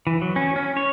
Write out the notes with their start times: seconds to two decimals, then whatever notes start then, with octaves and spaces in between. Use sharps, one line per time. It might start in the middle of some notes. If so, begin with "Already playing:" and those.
0.07 E3
0.21 F#3
0.36 C#4
0.56 C#4
0.77 C#5